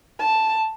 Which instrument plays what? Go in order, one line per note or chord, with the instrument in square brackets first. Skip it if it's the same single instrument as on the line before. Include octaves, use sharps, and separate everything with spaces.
[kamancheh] A5